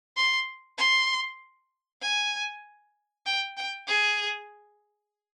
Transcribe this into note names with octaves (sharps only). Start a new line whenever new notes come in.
C6
C6
G#5
G5
G5
G#4